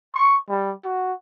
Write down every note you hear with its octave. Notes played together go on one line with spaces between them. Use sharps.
C#6
G3
F#4